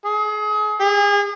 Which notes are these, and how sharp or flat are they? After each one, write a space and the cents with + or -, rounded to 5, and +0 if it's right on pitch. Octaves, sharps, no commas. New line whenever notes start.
G#4 +35
G#4 -35